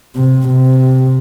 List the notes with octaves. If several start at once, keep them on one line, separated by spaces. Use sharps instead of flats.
C3
C3